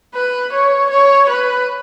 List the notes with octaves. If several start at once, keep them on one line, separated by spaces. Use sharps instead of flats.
B4
C#5
C#5
B4